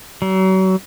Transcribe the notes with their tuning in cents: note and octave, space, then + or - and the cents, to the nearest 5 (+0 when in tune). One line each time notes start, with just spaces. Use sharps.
F#3 +35